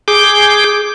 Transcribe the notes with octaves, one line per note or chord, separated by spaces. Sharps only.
G#4 D6 G6